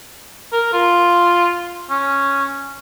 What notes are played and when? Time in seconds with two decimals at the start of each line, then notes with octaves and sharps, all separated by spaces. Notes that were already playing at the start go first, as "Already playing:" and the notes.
0.52 A#4
0.73 F4
1.90 C#4